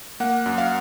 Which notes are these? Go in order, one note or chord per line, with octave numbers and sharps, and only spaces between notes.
A#3 F#5
F#2
F5